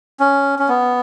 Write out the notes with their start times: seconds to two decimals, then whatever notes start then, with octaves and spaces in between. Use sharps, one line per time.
0.20 C#4
0.59 C#4
0.69 B3